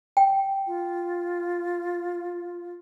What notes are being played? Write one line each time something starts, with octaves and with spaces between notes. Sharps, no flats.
G5
F4